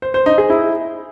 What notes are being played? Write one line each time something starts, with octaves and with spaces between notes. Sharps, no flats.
C5
C5
D#4
G#4
E4